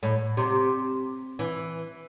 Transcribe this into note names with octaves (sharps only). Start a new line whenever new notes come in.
A2
C3
E3